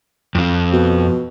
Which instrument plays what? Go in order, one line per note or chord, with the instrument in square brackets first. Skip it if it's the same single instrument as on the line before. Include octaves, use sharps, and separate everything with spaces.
[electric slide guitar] F2 F3
[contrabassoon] B2